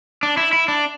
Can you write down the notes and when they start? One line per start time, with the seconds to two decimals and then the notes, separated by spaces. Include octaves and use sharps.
0.23 D4
0.37 E4
0.53 E4
0.68 D4